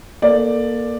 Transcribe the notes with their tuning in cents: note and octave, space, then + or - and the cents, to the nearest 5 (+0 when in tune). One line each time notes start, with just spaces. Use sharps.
A#3 +20 A4 +0 D5 +5